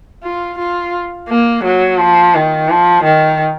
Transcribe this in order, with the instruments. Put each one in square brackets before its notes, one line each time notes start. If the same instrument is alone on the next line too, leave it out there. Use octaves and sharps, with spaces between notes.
[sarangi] F4
F4
A#3
F#3
F3
D#3
F3
D#3